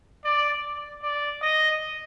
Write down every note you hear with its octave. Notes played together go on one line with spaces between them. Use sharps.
D5
D5
D#5